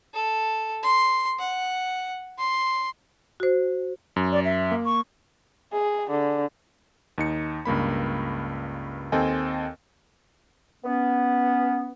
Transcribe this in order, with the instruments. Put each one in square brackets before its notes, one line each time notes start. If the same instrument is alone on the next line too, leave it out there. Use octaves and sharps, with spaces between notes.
[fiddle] A4
C6
F#5
C6
[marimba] F#4 C5
[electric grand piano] F#2
[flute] D5
E5
[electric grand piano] A#3
[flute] C#6
[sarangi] G#4
D3
[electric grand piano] D#2 D#4 C#7
C#2 G2 A#3 B5
D#2 C4 A4 D#5 G5 G#5
[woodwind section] B3 C#4